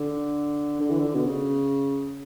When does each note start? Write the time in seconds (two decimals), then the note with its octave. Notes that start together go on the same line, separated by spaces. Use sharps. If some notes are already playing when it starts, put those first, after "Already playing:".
Already playing: D3
0.80 D3
0.90 E3
1.00 D3
1.15 B2
1.26 C#3